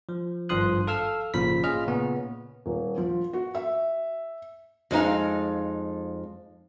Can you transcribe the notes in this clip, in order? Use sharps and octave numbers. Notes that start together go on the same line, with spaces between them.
F3
G#1 G2 F3 C6 D#6 F#6
A4 F5 E6 F6
G#1 A#2 C#3 F3 B5 B6
C#4 F4 G#4 D#5 F6
A#2 C#3 B3 C#4
D#1
F3
F#4
E5
F2 G#3 D#4 F5